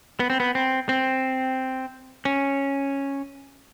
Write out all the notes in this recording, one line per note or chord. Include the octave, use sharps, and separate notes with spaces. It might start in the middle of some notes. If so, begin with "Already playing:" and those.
B3
C4
B3
C4
C4
C#4